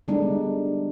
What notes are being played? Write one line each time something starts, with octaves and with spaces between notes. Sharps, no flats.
D3 G3 G#3 B3 D4 D#4